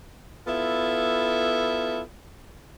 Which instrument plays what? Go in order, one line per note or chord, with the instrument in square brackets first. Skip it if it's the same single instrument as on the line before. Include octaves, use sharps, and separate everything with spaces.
[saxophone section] B3 E4 F4 A4